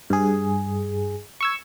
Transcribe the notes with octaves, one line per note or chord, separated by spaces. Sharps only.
G2 G#4
C#6 E6 G#6